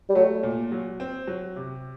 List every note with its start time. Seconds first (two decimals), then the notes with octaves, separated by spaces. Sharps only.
0.09 G3
0.15 F#3 A3
0.43 A#2
0.72 F#3
1.00 C4
1.27 F#3
1.56 C3